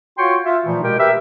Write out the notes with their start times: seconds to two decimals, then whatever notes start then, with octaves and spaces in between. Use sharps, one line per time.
0.18 F4 F#4 C#5 G5 C6 C#6
0.45 F4 E5
0.65 A#2 E3 F3 A3 D#4
0.83 B2 G#3 G4 A#4 G5
0.98 G4 A#4 B4 E5